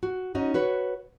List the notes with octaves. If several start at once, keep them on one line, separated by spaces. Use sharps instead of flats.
F#4
C#4 D#4 F#4
F#4 B4 C#5